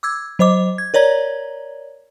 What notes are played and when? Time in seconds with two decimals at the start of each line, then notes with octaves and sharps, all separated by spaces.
0.03 D6 E6 G#6
0.39 F#3 C5 D#5 D6
0.78 G#6
0.94 A#4 C#5 D5 A#5 G#6